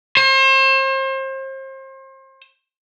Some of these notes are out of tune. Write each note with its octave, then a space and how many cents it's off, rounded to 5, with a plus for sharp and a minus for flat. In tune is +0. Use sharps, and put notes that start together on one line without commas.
C5 +35